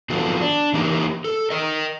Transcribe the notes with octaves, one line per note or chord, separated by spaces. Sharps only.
D#3 F3 F#3 B3 F4 A4
D4
E3 A#3 D#4 E4 G4 A#4
A4
A#4 D#5